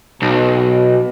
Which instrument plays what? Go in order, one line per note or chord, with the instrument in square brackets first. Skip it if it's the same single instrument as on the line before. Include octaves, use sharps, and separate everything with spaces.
[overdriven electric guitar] B1 [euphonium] B2